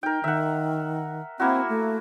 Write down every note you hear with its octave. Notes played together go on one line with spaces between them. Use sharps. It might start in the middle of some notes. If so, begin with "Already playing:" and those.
D#4 A#4 G5
D#3 E5 F#5
A#3 C4 E4 F#4
A3